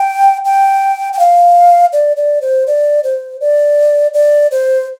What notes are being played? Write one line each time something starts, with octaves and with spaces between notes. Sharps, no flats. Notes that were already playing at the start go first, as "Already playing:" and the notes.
Already playing: G5
G5
G5
F5
D5
D5
C5
D5
C5
D5
D5
C5